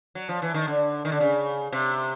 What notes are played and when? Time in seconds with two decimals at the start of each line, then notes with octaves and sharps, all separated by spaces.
0.15 F#3
0.29 F3
0.42 E3
0.54 D#3
0.67 D3
1.05 D#3
1.12 D3
1.20 C#3
1.73 C3